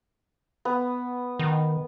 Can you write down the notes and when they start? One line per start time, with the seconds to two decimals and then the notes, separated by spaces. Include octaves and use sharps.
0.65 B3
1.39 D#3